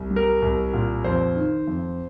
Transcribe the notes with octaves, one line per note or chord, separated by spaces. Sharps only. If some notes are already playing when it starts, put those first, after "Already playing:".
Already playing: C2
G3
A#4
C2
A#2
F2 C5
D#3
F2